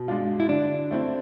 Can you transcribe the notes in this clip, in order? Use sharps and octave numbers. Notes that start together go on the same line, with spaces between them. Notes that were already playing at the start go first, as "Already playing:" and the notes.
Already playing: B2
G#3 D4 F4
E4
D3 D4
A3 C4 E4